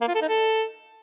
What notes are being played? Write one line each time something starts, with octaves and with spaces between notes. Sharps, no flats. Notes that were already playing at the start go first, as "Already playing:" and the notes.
A#3
F4
A4
D#4
A4